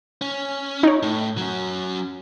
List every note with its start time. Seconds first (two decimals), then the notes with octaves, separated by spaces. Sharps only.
0.21 C#4
0.83 D#4 C#5
1.03 A2
1.38 F#3 C#4